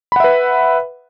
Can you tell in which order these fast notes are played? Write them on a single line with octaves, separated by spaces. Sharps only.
B5 F#5 E5 B4